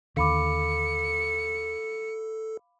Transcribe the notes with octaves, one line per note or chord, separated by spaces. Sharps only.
D#2 D3 A4 F5 B5 D6 C#7